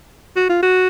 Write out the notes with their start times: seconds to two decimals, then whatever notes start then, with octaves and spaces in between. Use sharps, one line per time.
0.36 F#4
0.49 F4
0.63 F#4